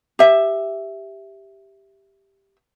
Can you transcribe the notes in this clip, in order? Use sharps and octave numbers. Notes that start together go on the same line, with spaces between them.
G4 E5